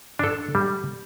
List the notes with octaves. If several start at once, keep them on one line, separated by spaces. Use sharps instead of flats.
D4 A4
G3